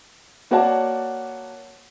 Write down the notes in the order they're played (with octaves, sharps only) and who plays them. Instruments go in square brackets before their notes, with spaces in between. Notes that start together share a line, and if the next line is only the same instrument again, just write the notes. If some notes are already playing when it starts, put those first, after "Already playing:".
[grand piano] A#3 F#4 C#5 D5 F#5 A5